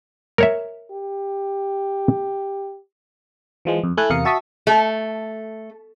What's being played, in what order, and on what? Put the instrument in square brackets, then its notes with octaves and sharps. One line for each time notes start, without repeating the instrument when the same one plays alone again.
[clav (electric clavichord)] A#4 C#5 E5
[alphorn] G4
[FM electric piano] E3 F3 G#3
F2
A3 E4 A4 G#5 F#6
E2 C3 A#4 F5 D#6 C#7
F#4 E5 A5 C#6 D#6 B6
[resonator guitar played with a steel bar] A3